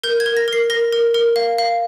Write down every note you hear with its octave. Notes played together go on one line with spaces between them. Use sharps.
A#4 G6
G#6
A#4
A#6
A#4 C7
A#4 A#6
A#4
A#4
F5
F5